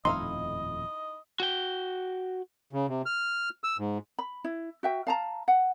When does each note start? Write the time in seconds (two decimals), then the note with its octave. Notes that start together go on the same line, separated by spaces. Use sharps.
0.05 D#1 F2 A2 D#4 E4 D#5 F5 C6
1.40 F#4 G5
2.73 C#3
2.88 C3
3.06 F6
3.64 E6
3.79 G#2
4.19 B5
4.44 E4
4.83 F#4 E5 G5
5.07 F5 A5 A#5
5.48 F#5